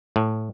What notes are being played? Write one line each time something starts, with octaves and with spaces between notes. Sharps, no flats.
A2